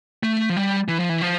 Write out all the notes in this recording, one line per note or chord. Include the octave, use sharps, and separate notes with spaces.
A3
F3
G3
E3
F3
E3
F3